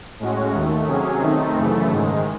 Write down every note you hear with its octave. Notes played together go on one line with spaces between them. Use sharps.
A2 G#3 C#4 F#4
D#2 D#3 A3
C3 F#3 C#4 G#4
D#3 A3 C4 D#4
F#2 C#3 E3 A3
G#2 D#3 G#3